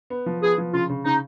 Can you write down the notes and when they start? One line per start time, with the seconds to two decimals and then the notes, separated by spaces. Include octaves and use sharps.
0.10 B3
0.26 F3
0.42 B3 G#4
0.58 F3
0.73 C#3 F4
0.89 C#3
1.05 C#3 D#4